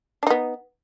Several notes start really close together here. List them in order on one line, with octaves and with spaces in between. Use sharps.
D4 D#4 B3